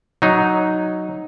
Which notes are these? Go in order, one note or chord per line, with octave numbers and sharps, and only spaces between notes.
F#3 D#4